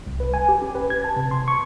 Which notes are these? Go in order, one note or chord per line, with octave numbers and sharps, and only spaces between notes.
C2
B4
G#5
G4
C#4
B4
G#6
A5
C3
C6
C#6